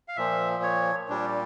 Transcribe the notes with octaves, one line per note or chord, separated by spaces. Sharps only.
F5
A#2 F3 E5
C#5
A#2 G3 D4